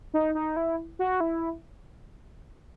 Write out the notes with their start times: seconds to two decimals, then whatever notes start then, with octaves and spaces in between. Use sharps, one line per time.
0.14 D#4
0.35 D#4
0.56 E4
0.99 F#4
1.20 E4